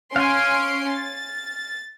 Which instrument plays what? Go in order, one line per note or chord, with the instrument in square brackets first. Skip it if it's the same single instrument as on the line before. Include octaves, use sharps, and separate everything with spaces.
[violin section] C#4 C6 D7 [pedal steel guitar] F5 G#5
[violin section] A6